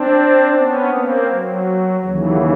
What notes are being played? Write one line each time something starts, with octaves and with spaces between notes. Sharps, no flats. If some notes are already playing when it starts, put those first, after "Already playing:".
Already playing: C4 D4
B3 C#4
A#3 C4
F#3
D#2 C#3 E3 F#3